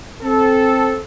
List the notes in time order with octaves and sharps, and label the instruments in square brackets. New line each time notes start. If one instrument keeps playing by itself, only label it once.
[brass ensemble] C4 A4